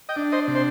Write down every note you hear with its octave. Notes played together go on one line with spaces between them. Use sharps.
D#5 G5
D4
C5 D#5
C3
C5